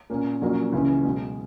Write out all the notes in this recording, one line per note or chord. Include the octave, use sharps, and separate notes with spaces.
A#2 A#3 C#4
A#1 A#2 F#3 A#3 C#4
C#2 C#3 E3 G#3 C#4
B1 B2 G#3